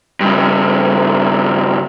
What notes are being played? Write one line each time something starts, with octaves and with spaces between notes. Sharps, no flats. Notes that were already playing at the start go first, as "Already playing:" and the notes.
G2 C#3